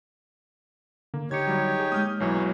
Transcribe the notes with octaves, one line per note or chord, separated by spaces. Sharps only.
D3 A#3
D3 D#4 G4 C#5 G#6 C#7
F#3 G3
G#4
G#3 A#3 D#6 F6 G6
B1 E3 F#3 C#5